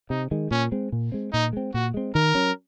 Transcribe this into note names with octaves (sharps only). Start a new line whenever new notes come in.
C3 D#4
D#3 G#3
A#2 C#4
G#3 C4
A#2
G#3 C4
A#2 D#4
G#3 C4
A#2 F#4
G#3 C4
D#3 A#4
F#3 C#4